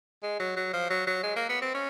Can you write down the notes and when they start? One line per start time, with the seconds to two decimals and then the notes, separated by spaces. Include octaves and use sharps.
0.23 G#3
0.39 F#3
0.56 F#3
0.73 F3
0.90 F#3
1.07 F#3
1.23 G#3
1.36 A#3
1.49 B3
1.62 C4
1.75 C#4